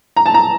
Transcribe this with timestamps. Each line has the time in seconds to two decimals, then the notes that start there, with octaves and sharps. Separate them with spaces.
0.16 A#5
0.26 A5
0.34 A#5